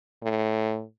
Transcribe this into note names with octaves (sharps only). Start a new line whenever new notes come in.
A2